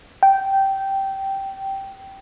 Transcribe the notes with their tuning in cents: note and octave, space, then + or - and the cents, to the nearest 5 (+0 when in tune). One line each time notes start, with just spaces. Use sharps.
G5 -10